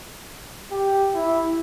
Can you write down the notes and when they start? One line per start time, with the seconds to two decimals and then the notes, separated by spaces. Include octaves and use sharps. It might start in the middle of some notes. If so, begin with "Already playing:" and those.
0.72 G4
1.15 E4